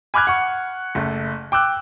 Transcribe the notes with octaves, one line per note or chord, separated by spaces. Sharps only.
G#5 B5 D6 F6 F#6 G#6
F#5 C#6
F#1 A3
G5 D6 E6 F#6